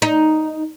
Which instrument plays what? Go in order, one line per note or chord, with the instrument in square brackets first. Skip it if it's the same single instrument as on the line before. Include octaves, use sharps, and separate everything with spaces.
[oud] D#4